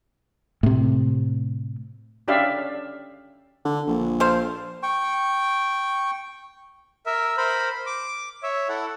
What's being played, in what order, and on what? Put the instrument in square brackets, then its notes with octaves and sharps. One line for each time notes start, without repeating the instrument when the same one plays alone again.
[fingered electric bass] A2 C3
[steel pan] C#4 D4 G4 D5 E5 F5
[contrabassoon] D3
A#1
[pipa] A4 C5 F5
[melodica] G5 C#6
[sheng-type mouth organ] A#4 E5
A#4 C5 B5
D6
C#5 E5
E4 A4 F#5